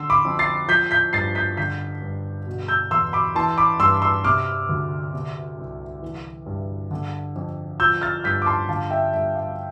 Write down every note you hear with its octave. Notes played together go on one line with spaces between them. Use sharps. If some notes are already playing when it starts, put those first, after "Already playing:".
Already playing: D3 C6 E6
B5 D6
F2
A6 C7
F3 G6 B6
G6 B6
G2 A6 C7
G6 B6
D3 G6 B6
G2
B2
E6 G6
E2 C6 E6
B5 D6
E3 A5 C6
B5 D6
G2 C6 E6
C6 E6
C3 D6 F6
D2
C3
C2
E3
G2
D3
F2
F3 E6 G6
F6 A6
G2 G6 B6
D6
A5 C6
D3 F5 A5
E5 G5
G2 E5
F5